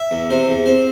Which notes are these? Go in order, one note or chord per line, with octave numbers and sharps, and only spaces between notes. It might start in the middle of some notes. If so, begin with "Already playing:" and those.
Already playing: E5
E2
C3 C5
E2
C4 C5